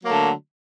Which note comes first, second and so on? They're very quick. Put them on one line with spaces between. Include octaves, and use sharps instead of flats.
F#3 A#3 A3 D3